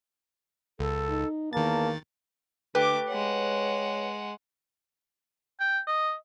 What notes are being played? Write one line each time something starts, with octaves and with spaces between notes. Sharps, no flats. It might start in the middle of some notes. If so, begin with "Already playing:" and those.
C#2 A4
D#4
E2 D#3 A#3 A5 A6
D3 A3 G4 B4 D6
G#3 C#5 F#5
G5
D#5